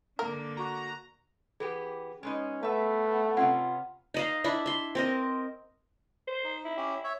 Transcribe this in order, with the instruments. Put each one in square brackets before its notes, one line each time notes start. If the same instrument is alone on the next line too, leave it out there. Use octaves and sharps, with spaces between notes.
[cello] D3 A#3 [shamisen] A#4
[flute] F#4 [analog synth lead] A#5
[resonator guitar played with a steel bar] E3 B3 G4 [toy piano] G#4
[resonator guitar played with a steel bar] G#3 B3 D#4 [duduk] C#4
[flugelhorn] A3 [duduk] B3 [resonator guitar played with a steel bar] B4 E5
[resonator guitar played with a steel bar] C3 B3 C#4 [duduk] F4 [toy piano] F#5
[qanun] D#4 D#5 F5
D4 E4 B5
E5 C6
C4 A#4 D#5
[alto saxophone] C5
[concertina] D#4
[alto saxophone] E4
[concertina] C#4 G4
C#5 E5